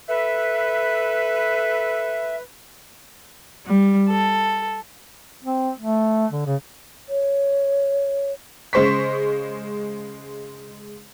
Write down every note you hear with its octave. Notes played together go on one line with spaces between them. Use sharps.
A4 B4 E5
G3
A4
C4
A3
D3
C#3
C#5
C#3 G#3 C5 C#6 B6